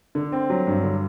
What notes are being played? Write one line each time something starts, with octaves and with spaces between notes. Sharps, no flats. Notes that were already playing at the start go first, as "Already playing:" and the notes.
D3
C4
F#3
G2
D3